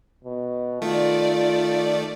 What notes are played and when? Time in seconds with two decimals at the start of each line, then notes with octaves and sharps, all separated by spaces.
0.24 B2
0.82 D#3 A3 F4 D5